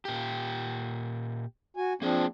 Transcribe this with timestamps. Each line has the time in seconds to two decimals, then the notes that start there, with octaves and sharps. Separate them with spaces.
0.05 A#2 G4
1.77 F#4 G#5
2.02 F3 A#3 C4 D4 G#4